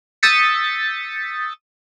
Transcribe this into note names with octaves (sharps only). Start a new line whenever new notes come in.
D#6 E6 G6 A6 B6 C#7